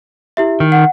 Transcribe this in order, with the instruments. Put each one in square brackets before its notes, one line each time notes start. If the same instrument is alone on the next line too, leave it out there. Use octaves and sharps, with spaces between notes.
[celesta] E4 G4 E5
[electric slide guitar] D#3
[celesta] F#5